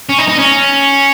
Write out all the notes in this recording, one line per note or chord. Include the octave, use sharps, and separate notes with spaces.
C#4
D#4
D#4
C#4